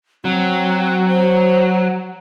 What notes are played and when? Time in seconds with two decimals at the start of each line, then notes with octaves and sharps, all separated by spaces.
0.25 F#3 C4
1.08 C5